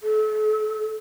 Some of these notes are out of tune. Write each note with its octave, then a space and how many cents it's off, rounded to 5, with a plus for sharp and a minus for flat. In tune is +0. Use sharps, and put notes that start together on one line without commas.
A4 -35